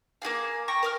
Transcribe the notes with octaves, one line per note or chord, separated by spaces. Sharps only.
A#3 F#4 G#4 F5
G5 A#5 C#6
A#4 D6 F6